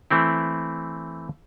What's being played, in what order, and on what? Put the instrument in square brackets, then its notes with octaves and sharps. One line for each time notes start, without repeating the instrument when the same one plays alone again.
[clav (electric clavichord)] E3 A3 C4 E4